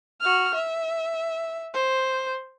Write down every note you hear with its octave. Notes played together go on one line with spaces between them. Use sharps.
F#4 F6
E5
C5